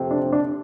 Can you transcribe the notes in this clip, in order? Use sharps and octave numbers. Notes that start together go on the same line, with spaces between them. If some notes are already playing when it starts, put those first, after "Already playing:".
Already playing: F2 C3 A3 C4
D4
D4